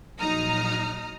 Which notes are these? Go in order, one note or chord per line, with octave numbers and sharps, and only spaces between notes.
A#1 F#3 D#4 A#5 D#6 F6